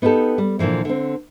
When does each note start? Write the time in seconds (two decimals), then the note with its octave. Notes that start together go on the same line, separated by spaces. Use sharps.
0.02 B3 D#4 E4 G4 A4
0.38 G3
0.59 A#2 D3 E3 F3 G#3
0.85 D3 C4